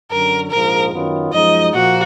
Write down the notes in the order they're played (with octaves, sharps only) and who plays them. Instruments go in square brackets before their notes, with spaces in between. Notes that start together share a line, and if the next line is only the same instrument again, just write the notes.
[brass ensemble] F#2 D3 F#3 [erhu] A#4
[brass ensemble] A#1 G#2 F3 [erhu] A#4
[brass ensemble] F#2 D#3 F#3 B3 F4
[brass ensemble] F#2 F3 G#3 D#4 [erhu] D#5
[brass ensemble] A#2 F3 A#3 [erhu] F#4